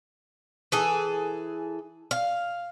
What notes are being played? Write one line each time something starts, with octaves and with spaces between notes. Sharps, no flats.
E3 G#4 A4
F5